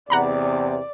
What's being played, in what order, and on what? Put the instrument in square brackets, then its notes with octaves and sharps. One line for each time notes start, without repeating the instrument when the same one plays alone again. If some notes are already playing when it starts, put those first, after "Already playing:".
[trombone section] E2 C3 [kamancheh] D5 [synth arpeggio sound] F#5 A#5 B5